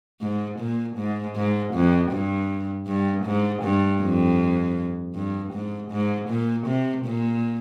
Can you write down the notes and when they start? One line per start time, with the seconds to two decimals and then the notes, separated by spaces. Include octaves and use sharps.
0.21 G#2
0.59 A#2
0.97 G#2
1.36 G#2
1.74 F2
2.11 G2
2.87 G2
3.25 G#2
3.63 G2
4.02 F2
5.15 G2
5.53 G#2
5.91 G#2
6.29 A#2
6.67 C3
7.05 A#2